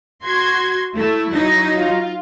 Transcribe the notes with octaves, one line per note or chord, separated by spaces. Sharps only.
F#4 C6 G#6
A3 E4
F#3 D#4
F4